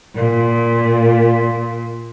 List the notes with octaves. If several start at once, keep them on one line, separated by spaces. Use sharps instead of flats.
A#2